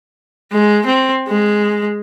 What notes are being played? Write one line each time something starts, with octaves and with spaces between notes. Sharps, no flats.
G#3
C4
G#3